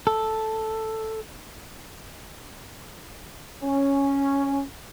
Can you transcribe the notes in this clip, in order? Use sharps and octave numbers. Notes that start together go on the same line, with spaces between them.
A4
C#4